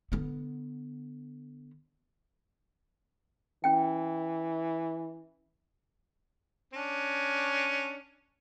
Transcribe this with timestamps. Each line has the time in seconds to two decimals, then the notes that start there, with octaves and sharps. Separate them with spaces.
0.12 D3 B3
3.64 E3 C#4 G5
6.74 C#4 D4